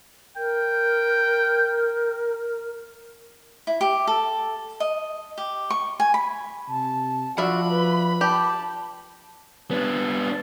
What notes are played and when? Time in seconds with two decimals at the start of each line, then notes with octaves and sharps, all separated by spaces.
0.37 A#4 G5
3.67 E4
3.81 G4
4.07 A4
4.80 D#5
5.38 G4
5.70 C#6
6.00 G#5
6.14 B5
6.68 C3 A5
7.38 F3 D4 F4 F#4 E5 B5
7.70 B4
8.21 G4 A5
9.71 B3 D4